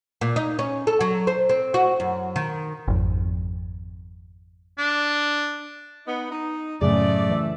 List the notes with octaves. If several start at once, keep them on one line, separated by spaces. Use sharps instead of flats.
A#2
D#4
C#4
A4
F#3
C5
C4
F#4
F#2
D#3
G#1 F2
D4
B3 D#4
D#4
F#2 A2 C#3 A3 G#4 D5
E3 E5